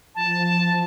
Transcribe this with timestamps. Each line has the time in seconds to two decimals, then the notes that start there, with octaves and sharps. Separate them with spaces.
0.15 F3 A5